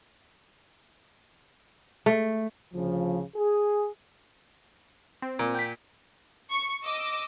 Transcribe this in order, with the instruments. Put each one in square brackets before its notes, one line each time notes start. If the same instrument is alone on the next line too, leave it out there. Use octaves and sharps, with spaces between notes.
[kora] A3
[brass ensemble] D2 C#3 F3
G#4
[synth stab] C4
[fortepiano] A#2
[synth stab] G5 B6
[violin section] C#6
D#5 D6 E6